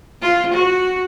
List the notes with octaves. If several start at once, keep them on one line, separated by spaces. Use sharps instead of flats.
F4
F#4